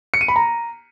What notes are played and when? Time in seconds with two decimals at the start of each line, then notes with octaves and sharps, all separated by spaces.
0.14 C#7
0.21 D#7
0.28 B5
0.36 A#5